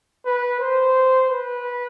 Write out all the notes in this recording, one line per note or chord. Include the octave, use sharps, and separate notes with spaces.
B4
C5
B4